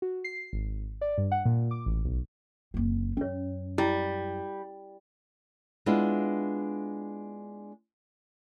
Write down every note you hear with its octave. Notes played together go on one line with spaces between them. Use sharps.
F#4
C7
G#1
D5
G2
F#5
A#2
D6
A1
B1
F#1 C4
F#2 C#4 C#5
G3 E4
G#3 B3 D4 E4 F4